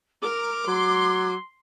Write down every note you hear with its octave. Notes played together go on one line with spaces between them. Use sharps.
A#4 D6
F#3 C6